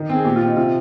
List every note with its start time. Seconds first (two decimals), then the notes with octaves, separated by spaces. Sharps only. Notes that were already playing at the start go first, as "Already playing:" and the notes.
Already playing: D#3
0.10 C4
0.15 G#4
0.25 A#2 G4
0.36 F4
0.41 C4
0.48 D#4
0.56 C3 F4